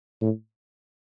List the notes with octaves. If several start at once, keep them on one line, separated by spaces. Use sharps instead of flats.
A2